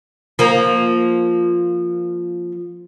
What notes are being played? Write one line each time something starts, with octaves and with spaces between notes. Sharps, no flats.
F3 A#3